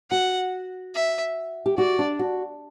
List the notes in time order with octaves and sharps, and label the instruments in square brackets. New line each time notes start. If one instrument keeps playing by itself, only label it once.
[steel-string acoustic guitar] F#4 [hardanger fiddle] F#5
[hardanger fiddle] E5
[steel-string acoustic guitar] G4
[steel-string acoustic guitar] F#4 [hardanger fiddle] D5
[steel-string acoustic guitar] D4
F#4